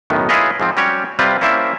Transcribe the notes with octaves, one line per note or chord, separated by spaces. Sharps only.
B1 F#2 A2 D#3 B3
E4 F4 G#4 B4 C#5 D#5
G#2 F3 C4
G3 C#4 F#4 G4 C#5
C3 G3 C4 F4 B4
A#3 C#4 E4 C5 D5 E5